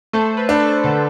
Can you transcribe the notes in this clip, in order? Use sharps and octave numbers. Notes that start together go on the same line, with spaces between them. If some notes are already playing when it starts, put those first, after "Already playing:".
A3 A4 C5
B4
D4
A4
D3 A4